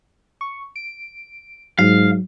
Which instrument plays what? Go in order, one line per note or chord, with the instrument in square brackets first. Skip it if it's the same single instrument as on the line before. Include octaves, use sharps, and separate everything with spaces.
[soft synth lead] C#6
D7
[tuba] G#2 [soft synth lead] F#3 [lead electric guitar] F5